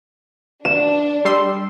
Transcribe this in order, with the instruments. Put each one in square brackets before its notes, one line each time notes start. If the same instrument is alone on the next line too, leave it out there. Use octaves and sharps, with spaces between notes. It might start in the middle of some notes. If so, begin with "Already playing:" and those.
[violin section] D4 [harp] E7
[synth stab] G3 C6 E6